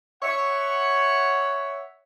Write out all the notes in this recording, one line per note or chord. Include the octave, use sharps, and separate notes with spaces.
C#5 E5 F#5